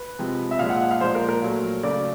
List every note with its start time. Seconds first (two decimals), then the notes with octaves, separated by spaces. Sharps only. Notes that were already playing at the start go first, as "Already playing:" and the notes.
Already playing: B4
0.19 C3 F3 G#3
0.51 E5
0.59 A#2 F3 G#3 F5
0.70 F#5
0.81 F#5
0.91 F5
1.00 A#2 F3 G#3 C5
1.15 A#4
1.29 A#4
1.42 A#2 F#3 A3
1.83 C#3 F#3 A3 D5